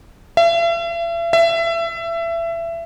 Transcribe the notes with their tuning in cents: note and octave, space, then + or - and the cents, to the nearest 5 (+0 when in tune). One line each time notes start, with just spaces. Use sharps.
E5 +40
E5 +25